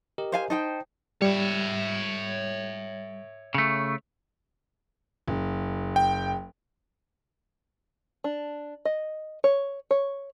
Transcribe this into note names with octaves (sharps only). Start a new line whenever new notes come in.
G4 A#4 D#5
C5 F5 G#5
D#4 C5 G5 A5
G3 C#5 E5
C#3 A3
F#1
G5
D4
D#5
C#5
C#5